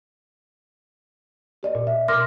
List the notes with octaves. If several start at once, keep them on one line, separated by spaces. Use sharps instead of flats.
G4 D5 D#5
A#2
E5
B2 A#4 C6 D6 F6 A#6